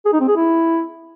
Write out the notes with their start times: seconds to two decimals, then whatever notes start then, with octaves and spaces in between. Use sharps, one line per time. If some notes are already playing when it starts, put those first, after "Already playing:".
0.05 G#4
0.13 D#4
0.20 C4
0.28 G#4
0.36 E4